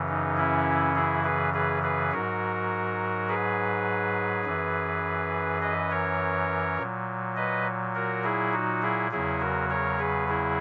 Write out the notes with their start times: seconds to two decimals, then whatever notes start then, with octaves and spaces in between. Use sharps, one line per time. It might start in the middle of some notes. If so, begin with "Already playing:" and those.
Already playing: F#2 C#3 E3
0.08 D#4
0.37 C#4 E4
0.95 E4 G#4
1.24 G#4 B4
1.54 G#4 B4
1.83 G#4 B4
2.12 G#2 F#3 F#4 A#4
3.29 G#4 B4
4.45 F#2 E3
5.62 B4 D#5
5.90 A#4 C#5
6.78 A#2 F#3
7.36 B4 D#5
7.95 F#4 A#4
8.24 E4 G#4
8.53 D#4 F#4
8.82 E4 G#4
9.11 E2 C#3 F#3 E4 G#4
9.40 F#4 A#4
9.69 A#4 C#5
9.99 G#4 B4
10.28 E4 G#4